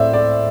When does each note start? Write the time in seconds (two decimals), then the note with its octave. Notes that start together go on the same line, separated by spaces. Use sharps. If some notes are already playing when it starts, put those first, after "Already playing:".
Already playing: A2 C4 C5 D5 E5
0.13 D5